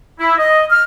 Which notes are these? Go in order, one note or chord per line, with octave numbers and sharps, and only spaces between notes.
E4
D#5
F6